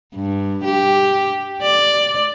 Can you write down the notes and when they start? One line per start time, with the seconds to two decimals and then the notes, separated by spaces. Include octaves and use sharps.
0.15 G2
0.64 G4
1.63 D5